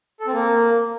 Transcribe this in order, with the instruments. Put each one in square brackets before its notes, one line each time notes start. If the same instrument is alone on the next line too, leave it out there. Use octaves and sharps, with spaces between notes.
[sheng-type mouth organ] A4
C4
A#3